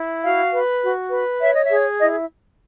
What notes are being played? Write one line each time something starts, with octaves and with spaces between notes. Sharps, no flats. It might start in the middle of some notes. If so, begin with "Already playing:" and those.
Already playing: E4
F#4 F5
B4
F#4
B4
C#5 E5
D#5
E5
G#4
E4 D#5